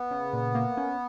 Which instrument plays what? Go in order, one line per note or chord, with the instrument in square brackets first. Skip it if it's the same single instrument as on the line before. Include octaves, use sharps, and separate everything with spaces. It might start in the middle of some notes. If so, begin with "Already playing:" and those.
Already playing: [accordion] B3
[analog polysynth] C#3
A#2
A#3
C#4